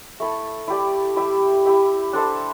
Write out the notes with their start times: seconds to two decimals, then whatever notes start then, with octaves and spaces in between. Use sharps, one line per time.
0.20 A3 E4 A4
0.68 E4 G4 D5
1.16 G3 E4 G4 E5
1.65 E4 G4 E5
2.13 D4 A4 C5 E5